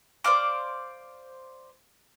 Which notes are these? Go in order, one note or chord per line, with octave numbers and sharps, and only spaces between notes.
C5 D5 F5 D6